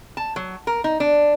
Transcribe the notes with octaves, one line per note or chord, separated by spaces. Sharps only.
A5
F#3
A#4
D#4
D4